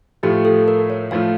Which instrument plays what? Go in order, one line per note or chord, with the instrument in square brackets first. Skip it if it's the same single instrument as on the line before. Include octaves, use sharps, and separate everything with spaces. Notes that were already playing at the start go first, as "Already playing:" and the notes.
[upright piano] A2 F3 A3 [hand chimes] G4
[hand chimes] A4
A#4
C#5
[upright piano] A2 F3 A3 [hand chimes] F5